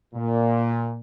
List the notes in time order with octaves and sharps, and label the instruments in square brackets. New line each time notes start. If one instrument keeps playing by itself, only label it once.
[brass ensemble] A#2